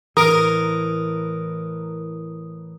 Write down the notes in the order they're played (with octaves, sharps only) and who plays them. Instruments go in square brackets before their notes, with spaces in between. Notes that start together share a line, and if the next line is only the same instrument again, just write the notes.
[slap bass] A2 E3 [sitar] A#4 [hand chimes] D#6